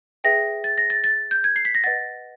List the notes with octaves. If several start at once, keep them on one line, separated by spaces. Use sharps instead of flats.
G#4 B4 E5 G5 A#6
A6
A#6
A6
A6
G6
G#6
C7
B6
A#6
B4 D#5 F#5 A6